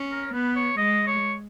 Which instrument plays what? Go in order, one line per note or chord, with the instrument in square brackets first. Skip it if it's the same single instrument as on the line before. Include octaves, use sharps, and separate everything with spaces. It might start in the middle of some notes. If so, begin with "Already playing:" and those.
Already playing: [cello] C#4
[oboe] A#4
[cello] B3 [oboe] B4
[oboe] C#5
[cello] G#3 [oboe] D#5
[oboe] C#5